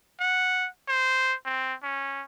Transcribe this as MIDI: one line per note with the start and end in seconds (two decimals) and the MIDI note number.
0.20 0.68 78
0.88 1.34 72
1.45 1.74 60
1.83 2.24 61